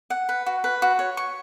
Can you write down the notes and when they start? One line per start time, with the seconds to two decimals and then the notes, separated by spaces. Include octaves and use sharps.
0.10 F#5
0.29 B4
0.46 F#4
0.64 B4
0.82 F#4
0.99 C#5
1.17 C#6